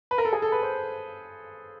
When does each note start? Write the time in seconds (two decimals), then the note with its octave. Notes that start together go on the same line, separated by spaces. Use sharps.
0.11 B4
0.18 A#4
0.25 A4
0.33 G#4
0.42 A4
0.52 B4
0.63 C5